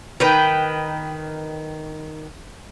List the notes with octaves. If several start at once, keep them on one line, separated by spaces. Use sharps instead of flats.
D#3 B4 G5